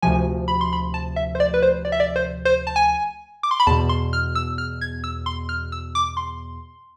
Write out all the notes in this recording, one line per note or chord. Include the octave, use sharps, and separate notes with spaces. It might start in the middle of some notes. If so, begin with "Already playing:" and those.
D2 C3 F3 G#5
B5
C6
B5
A5
E5
C5
D5
B4
C5
D5
E5
D5
C5
C5
A5
G#5
D6
C6
B5
E2 B2 A5
C6
F6
E6
F6
G#6
E6
C6
F6
E6
D6
C6